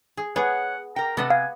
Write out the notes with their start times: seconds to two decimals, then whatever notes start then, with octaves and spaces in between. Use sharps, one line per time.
0.17 G#4
0.36 B3 G#4 C#5 F#5
0.96 A#4 G5 A#5
1.17 C3 B3 A4 D#5 F#5
1.30 F5 G#5